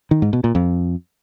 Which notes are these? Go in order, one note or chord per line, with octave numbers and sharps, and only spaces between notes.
D#3
G#2
B2
A#2
F2